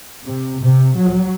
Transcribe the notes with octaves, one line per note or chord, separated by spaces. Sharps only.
C3
C3
F#3